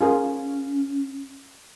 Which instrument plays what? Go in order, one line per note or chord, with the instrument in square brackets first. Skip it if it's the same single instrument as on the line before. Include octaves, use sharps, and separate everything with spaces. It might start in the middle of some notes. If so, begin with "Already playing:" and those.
[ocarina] C#4 [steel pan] F4 G#4 A#4